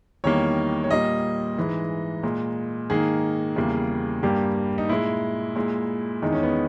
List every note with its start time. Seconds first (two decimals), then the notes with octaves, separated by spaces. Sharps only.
0.24 E2 D#3 G3 A#3 C#5
0.84 C#5
0.90 A#2 G3 A#3 D#5
1.57 G#2 E3 G#3
2.23 A#2 G#3
2.90 G#2 D#3 A#3 G#4
3.56 E2 C#3 G3 A#3
4.23 G2 G3 A#3 G4
4.78 D#4
4.89 A#2 G#3 E4
5.56 A#2 G#3
6.22 E2 D#3 G#3 D#4
6.32 C#4
6.43 B3